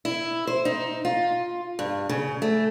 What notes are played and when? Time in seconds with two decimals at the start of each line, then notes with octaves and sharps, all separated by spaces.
0.05 E4
0.47 C5
0.65 D#4
1.05 F4
1.79 G2
2.09 C#3
2.42 A3